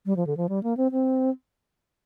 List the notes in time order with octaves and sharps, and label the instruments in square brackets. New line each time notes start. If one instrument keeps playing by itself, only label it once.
[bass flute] G3
F3
D3
F3
G3
A#3
C4
C4